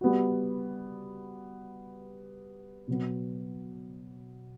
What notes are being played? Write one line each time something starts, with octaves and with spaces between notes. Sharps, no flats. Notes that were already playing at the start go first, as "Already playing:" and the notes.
G3 B3 F#4
B2 F#3 B3